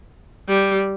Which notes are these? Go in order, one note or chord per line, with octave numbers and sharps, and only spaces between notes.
G3